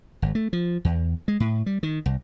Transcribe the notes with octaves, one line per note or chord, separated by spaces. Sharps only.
G#1
A3
F3
E2
G#3
A2
G3
D#3
C2